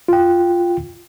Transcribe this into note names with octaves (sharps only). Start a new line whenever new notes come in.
F4 G5